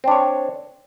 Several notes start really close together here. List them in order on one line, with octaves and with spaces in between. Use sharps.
C4 D4 C#5